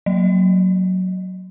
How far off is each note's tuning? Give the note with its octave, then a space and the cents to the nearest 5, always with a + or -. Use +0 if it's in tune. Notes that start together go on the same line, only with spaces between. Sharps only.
F#3 +0 D#5 +0